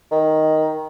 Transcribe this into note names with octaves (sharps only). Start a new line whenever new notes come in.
D#3